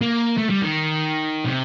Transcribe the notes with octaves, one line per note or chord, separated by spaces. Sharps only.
A#3
A3
G3
D#3
C3